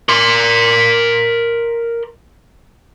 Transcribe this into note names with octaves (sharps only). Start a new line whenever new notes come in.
A#4 C6